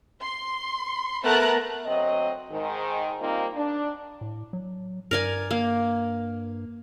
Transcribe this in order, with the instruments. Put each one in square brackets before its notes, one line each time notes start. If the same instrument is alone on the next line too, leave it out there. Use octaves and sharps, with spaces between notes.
[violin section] C6
A3 B3 A#4 A5 A#5 F#6
[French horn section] D2 F#3 C4 D#5
G#2 D#3
G3 A#3 C4 D#4 F4
D4
[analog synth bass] A2
F#3
[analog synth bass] G2 [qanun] A#4 D5 G#5
[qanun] A#3